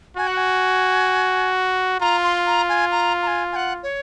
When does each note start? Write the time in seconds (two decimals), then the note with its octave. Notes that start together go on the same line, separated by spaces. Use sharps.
0.17 F#4 G#5
0.27 F#5
0.37 G#5
2.01 F4 A#5
2.23 C6
2.46 A#5
2.69 G#5
2.92 A#5
3.22 A#5
3.27 G#5
3.52 G#5
3.56 F#5
3.83 C#5